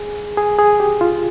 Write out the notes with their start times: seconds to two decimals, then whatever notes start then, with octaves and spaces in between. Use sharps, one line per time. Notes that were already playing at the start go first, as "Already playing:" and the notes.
Already playing: G#4
0.37 G#4
0.59 G#4
0.80 G4
1.01 F4